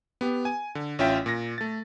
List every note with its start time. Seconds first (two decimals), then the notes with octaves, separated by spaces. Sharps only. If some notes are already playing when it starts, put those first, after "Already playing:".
0.21 B3 G4
0.45 G#5
0.75 D3
0.99 A1 C#4 F4 E5 G5 B6
1.26 A#2 A#6
1.58 A3 A6